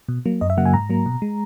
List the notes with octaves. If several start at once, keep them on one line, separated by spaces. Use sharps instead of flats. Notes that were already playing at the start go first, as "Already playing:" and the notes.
B2
F#3 A#3
F#2 D#5
E5
C#3 F#3 A#3 F#5
G#5
G#2 A#5
F#3 A#3
B2
G#3